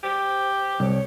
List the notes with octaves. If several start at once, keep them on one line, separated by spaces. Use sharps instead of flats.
G4 C5
C2 C#5